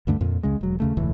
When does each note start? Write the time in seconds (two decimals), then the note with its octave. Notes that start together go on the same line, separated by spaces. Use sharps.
0.07 D2 G2 D3 A3
0.21 F2 A#2
0.43 C#2 C#3 G#3
0.61 E1 F#3
0.80 D#2 C#3 A3
0.97 E1 C#2 A2 E3